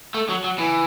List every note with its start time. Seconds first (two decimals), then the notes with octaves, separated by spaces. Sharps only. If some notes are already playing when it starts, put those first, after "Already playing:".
0.14 A3
0.29 F#3
0.44 F#3
0.59 E3